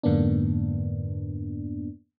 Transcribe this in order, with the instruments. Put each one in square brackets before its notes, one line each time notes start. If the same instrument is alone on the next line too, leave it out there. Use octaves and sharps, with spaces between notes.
[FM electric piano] F2 G#2 D3 A#3 B3 D4